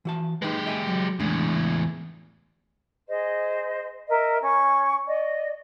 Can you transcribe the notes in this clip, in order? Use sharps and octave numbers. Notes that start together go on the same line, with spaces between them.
E3 F#4 A5
G#3 D#4 G4 B4
D#5 E5 G#5
F#3
E2 A2 G#3 A3 D4
G#4 C5 D#5
A#4 D#5 E5
C#4 C#6
D5 D#5